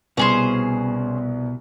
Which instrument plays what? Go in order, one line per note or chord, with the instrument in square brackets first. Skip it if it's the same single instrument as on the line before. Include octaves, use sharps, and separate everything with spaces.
[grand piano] C2 B3 F#7 [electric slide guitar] B2 [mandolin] C#4 G#4 C5